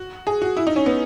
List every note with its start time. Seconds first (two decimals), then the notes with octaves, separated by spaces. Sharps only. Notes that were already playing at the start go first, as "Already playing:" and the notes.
Already playing: F#4
0.27 G#4
0.42 F#4
0.57 E4
0.67 D#4
0.76 C#4
0.86 B3